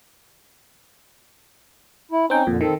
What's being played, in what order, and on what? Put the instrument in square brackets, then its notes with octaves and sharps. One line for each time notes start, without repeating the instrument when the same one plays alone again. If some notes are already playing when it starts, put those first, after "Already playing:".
[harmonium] E4
[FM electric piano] C4 G5 [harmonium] C#4 D#4
[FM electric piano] F2 A#2 [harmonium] D3
[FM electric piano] D#3 [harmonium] C4 A4